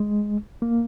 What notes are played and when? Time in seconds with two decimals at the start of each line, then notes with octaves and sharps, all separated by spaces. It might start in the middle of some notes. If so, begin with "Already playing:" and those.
Already playing: G#3
0.62 A#3